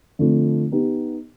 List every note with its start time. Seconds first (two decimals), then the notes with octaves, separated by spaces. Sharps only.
0.19 D3 F3 A3 C4
0.72 B3 D#4 G4